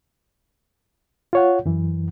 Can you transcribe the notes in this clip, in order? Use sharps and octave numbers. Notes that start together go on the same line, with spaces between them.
F4 C#5 F#5
F#2 E3